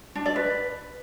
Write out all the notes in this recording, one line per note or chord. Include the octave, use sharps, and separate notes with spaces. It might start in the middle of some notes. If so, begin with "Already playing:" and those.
D4
D5
B4